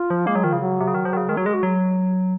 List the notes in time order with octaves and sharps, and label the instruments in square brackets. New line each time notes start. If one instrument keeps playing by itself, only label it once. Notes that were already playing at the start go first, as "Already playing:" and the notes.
Already playing: [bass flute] F4
[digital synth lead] F3
[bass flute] G#3 [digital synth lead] A#3
[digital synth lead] F#3
[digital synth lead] D#3 [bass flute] F3
[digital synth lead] C#3
[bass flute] F#3
[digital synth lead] C3
C#3
D#3
F3
D#3
C#3
[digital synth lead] D#3 [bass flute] G#3
[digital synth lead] F#3 [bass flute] F#4
[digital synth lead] G#3 [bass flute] G#4
[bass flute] F#4
[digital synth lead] F#3